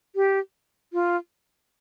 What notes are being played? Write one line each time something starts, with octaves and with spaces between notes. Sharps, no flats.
G4
F4